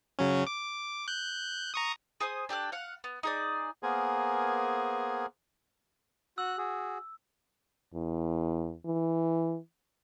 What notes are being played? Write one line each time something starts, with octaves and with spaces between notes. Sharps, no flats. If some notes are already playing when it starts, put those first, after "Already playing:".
C#3 F#3 C#4
D6
F#6 G6
A#5 C#6 D#6
G#4 C5 G#5 D#6
D4 G4 A4 F#6
F5 F#5
B3
D#4 G#4 D5
A#3 B3 G#4 A#4 C5 G#5
F#4 E6 F#6
F#4 G#4
E2
E3